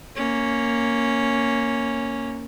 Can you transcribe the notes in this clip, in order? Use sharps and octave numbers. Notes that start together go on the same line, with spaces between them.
A#3 C#4